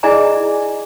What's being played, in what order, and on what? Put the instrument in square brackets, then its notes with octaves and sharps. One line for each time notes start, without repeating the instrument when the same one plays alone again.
[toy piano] E4 G#4 D5 D#5 G#5 A#5